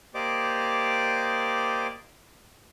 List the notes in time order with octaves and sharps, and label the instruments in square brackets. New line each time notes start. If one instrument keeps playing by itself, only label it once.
[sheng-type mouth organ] A#3 G4 C5 D5 D#5 D6